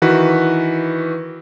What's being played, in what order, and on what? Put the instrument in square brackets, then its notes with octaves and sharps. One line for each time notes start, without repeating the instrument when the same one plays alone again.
[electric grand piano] D#3 E3 F#4 B4